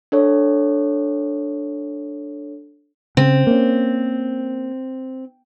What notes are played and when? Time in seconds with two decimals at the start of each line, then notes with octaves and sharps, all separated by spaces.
0.12 D4 A4 C#5
3.17 C#3 C4
3.47 A#3 C#4